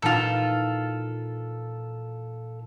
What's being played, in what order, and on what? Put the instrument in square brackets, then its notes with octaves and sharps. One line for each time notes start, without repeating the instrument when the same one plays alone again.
[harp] A#2 E3 D#4 [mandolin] F4 A4